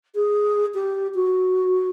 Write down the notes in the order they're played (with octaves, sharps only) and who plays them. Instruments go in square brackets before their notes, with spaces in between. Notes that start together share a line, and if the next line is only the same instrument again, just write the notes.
[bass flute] G#4
G4
F#4